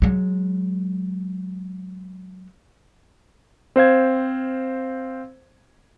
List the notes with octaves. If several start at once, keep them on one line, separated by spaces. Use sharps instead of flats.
F#3 G#3
C4 C5 F5 G#6